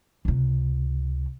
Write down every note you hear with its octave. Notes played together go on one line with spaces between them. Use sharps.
C#2 C3